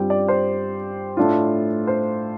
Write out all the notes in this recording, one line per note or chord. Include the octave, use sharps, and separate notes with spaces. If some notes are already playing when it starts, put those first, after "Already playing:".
Already playing: G2 G3 C4 F4 G5
D5
C5
A2 A3 D4 F4
C5